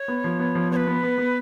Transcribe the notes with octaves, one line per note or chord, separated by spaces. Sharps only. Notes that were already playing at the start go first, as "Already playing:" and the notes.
Already playing: C#5
B3
F3
B3
F3
B3 B4 C#5
B3
B3
B3